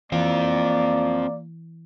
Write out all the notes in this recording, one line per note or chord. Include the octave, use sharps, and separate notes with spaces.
E3 A#3 C4 F4 D5